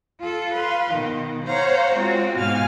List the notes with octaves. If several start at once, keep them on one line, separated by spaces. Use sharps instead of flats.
F4 A4
B4 F5 C6
B2 D#3
C5 C#5 F5 F#5 A#5
G#3 C4 F4 F#4
G#2 B2 F5 G#5 F6